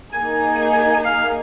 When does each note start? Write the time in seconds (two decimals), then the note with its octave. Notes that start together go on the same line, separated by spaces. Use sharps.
0.13 A#3 D#4 G#4 G#5
0.73 G#5
1.04 F5